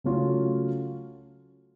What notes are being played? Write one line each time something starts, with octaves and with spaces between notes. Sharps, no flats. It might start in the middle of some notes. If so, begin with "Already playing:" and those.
C#3 F#3 A3 C#4 F4